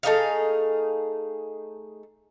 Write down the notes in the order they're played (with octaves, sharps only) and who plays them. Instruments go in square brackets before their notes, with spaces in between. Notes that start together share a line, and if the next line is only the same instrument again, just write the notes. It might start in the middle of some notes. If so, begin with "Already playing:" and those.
[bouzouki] A3 D#4 G#4 F5